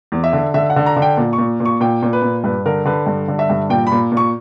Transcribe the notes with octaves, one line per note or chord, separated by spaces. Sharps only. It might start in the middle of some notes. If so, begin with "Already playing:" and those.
E2
E5
D3
D3 E5
F#5
D3
A#5
D3
G5
A#2
C#6
A#2
A#2
C#6
A#2 G5
A#2
B4
A#2
G2 B4
D3 A#4
D3 B4
G2
D3
E5
G2
A#2 G5
B5
A#2
A#2
C#6